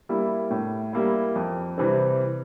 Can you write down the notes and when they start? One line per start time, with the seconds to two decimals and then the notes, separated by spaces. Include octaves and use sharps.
0.09 G3 A#3 E4
0.51 A2
0.93 G3 A#3 E4
1.35 F2
1.78 C3 E3 G3 C4